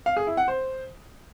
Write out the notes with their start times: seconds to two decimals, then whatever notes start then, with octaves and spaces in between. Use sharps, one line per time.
0.06 F5
0.17 G#4
0.27 E4
0.37 F#5
0.48 C5